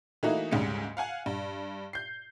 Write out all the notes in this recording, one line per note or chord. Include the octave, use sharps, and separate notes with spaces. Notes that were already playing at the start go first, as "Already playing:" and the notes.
E3 A3 A#3 D#4 E4 F#4
D2 G#2 C#3 G3 C#7
F5 F#5 G#5
G2
G6 C7